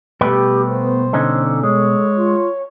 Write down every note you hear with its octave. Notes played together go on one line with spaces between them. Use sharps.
B2 G3 A3 G4 B4 G5
B3 C5
D3 C#4 D#4 A4
G#3 C#5
F4